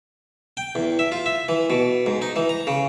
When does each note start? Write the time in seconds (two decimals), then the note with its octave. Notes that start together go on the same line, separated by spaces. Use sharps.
0.57 G5
0.75 E2
0.99 E5
1.12 F4
1.26 E5
1.49 E3
1.70 B2
2.06 G#2
2.22 D#4
2.36 E3
2.49 A#5
2.67 C#3